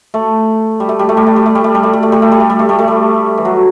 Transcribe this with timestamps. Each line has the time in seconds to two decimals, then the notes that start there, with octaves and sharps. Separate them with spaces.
0.14 A3
0.80 G3
0.89 A3
0.99 G3
1.09 A3
1.17 G3
1.27 A3
1.36 G3
1.46 A3
1.55 G3
1.64 A3
1.75 G3
1.83 A3
1.93 G3
2.03 A3
2.12 G3
2.22 A3
2.32 G3
2.40 A3
2.50 G3
2.59 A3
2.69 G3
2.79 A3
2.88 G3
3.38 E3
3.45 F#3